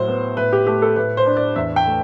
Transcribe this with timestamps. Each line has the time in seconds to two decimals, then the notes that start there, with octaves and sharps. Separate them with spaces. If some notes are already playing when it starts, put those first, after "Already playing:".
Already playing: A2 F#3 C5
0.08 B3
0.37 A2 B4
0.53 G4
0.67 A3 G4
0.82 A4
0.96 A2 B4
1.17 C5
1.26 D4
1.37 D5
1.56 E2 E5
1.76 G5
1.86 A3